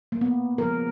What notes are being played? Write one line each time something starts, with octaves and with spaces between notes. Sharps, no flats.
A#3
B3
C#3 F3 G#3 A#4